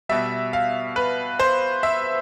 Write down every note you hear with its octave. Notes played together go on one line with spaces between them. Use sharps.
B2 G3 E5
F5
B4
C5
E5